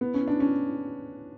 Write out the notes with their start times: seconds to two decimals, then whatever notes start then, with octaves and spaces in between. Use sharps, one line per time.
0.01 B3
0.14 C#4
0.27 D4
0.40 C#4